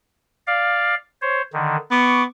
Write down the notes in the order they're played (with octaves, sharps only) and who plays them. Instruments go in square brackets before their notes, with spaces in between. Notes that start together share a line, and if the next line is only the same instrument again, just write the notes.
[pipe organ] D5 F5
C5 C#5
D3 D#3
[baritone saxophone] B3 [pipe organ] C#6 D6